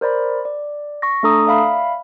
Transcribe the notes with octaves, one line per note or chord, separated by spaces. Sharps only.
A#4 C5 D5 B5
D5
C#6 A#6
A3 D4 A4 A#5 D#6
D5 E5 F5 B5